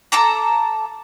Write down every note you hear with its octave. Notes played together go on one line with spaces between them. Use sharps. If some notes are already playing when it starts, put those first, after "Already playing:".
A4 A5 A#5 D6